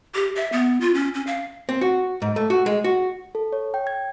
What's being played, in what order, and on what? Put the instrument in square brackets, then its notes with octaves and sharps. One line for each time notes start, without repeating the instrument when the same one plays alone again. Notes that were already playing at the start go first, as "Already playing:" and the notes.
[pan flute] G4
E5
B3
F4
C#4
C#4
F5
[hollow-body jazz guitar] C4
F#4
G#2
A3
F#4
G#3
F#4
[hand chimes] A4
C#5
G5
G#6